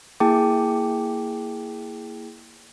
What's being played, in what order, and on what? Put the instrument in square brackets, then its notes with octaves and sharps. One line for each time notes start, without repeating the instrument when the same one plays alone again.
[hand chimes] A#3 E4 G#4 G5 A5 D6